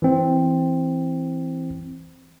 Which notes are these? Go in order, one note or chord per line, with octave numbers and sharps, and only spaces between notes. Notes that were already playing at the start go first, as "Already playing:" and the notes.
E3 C4